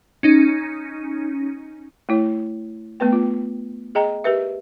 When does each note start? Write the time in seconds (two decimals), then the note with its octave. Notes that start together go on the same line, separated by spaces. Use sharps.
0.23 C#4 D#4
2.09 A3 E4 C#5
3.00 A3 B3 B4 G5
3.13 F4
3.95 G#4 D#5 G5 A#5
4.24 G4 A#4 B4 E5